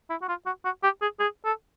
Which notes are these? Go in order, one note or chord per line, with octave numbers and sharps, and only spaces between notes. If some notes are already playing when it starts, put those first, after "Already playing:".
E4
F#4
F4
F#4
F#4
G4
G#4
G#4
A4